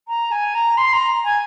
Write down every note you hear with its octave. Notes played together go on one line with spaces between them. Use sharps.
A#5
G#5
A#5
C6
A#5
G#5